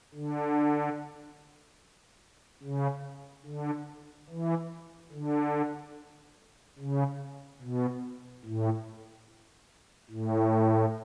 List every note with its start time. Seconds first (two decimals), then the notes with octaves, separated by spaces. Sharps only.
0.14 D3
2.63 C#3
3.46 D3
4.29 E3
5.12 D3
6.79 C#3
7.61 B2
8.45 A2
10.10 A2